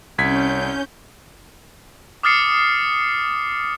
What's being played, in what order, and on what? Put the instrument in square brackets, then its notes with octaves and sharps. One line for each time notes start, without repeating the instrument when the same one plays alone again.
[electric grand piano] C2 G#6 B6 [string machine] C#4 G6
[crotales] D6 D#6 F6 A6 C7 C#7